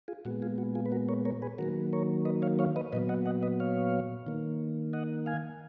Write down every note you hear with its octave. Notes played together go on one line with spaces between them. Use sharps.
F4 G#4
A#2 G#3 B3 F#4
F4 G#4
F#4
F4 G#4
B4
F#4 A#4
A#4 C#5
A#4 C#5
G#4 B4
D#3 F#3 A#3 F#4 A#4
A#4 C#5
B4 D#5
C#5 F5
C#5 F5
B4 D#5
A#2 F#3 B3 B4 D#5
D#5 F#5
D#5 F#5
B4 D#5
C#5 F5
D#3 A#3
D#5 F#5
F5 G#5